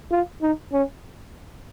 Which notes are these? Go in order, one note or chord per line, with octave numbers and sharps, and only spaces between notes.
F4
D#4
C#4